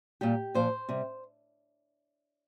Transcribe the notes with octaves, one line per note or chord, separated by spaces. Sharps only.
A#2 G3 G4
A#2 F3 C5
C3 G3